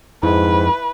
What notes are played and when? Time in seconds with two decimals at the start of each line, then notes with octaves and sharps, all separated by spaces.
0.23 F2 G#2 E4 B4